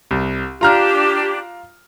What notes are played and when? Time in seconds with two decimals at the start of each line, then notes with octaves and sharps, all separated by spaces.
0.11 C2
0.61 D4 F4 G4 A#5 F6